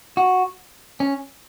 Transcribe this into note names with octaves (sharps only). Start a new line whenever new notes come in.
F#4
C#4